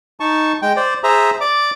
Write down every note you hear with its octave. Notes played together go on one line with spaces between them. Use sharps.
D#4 A5 C#6
G#3 G5
C5 D5
G#4 C5 E5 A#5
D5 D6